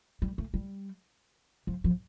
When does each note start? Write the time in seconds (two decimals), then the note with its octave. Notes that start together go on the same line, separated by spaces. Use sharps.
0.22 G3
0.38 A3
0.54 G3
1.67 F3
1.84 F3